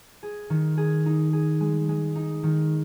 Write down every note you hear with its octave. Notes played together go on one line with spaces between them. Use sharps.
G#4
D#3
G#4
D#4
G#4
G#3
G#3
D#4
D#3